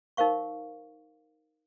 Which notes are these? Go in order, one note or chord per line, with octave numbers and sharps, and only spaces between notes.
D#4 A#4 C5 F5 C#6